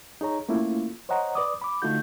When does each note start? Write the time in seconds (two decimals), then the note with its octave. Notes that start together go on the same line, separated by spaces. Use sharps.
0.21 D#4 G#4 C#5 A#5
0.49 A3 A#3 C#4 E4 F4
1.09 C5 C#5 D#5 F#5 A#5
1.35 B4 D5 D6 D#6
1.62 B5 D6
1.82 D3 A3 D#4 F4 F#4 G6